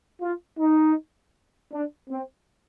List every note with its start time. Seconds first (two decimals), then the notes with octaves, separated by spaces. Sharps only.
0.21 F4
0.59 D#4
1.72 D4
2.09 C4